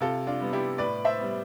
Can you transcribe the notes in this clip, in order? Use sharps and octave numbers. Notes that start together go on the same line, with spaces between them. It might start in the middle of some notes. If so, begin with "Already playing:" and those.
C3 F4 A4
D4 F4
G3 B3
E4 G4
A2 B4 D5
C5 E5
G3 B3